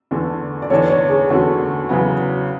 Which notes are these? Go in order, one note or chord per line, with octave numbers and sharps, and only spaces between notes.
E2 D3 A3
D5
E2 D3 A3 C#5
C#5
G#4
E2 D3 A3 F#4
E2 C#3 F#3 B3